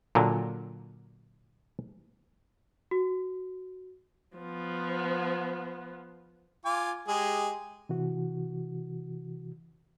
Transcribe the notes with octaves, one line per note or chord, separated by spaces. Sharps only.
A#2 D3 F#3
F#4
F3 B3
F4 G#5 D6
G#3 G4 G#4
C3 E3 F#4